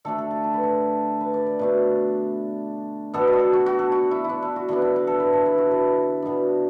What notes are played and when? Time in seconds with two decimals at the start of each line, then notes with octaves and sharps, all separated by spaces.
0.05 D3 A3 D4 A4
0.18 A4
0.31 A4
0.44 A4
0.54 B4
0.63 A4
1.21 B4
1.34 D5
1.46 D5
1.59 B2 A3 D4 B4
3.14 B2 B3 D4 A4
3.28 B4
3.33 F#4
3.39 A4
3.53 F#4
3.66 F#4
3.79 A4
3.92 F#4
4.11 E4
4.24 E4
4.29 D4
4.42 E4
4.56 F#4
4.68 D3 B3 D4 E4
4.82 E4
4.96 B4
5.07 A4
5.20 B4
5.33 A4
5.46 B4
5.58 F#4
5.71 B4
6.22 B2 B3 D4